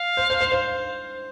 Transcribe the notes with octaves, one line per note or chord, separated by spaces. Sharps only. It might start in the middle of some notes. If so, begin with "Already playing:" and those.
Already playing: F5
C5
C5
C5
C5